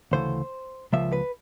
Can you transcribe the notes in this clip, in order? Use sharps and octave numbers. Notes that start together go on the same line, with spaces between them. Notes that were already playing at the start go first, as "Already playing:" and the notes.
D2 C#3 E3 A3 C5
C#2 C#3 F3 A#3 E5
B4